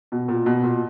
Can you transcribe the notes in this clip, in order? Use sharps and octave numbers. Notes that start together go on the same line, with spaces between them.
B2
A#2
B2
A#2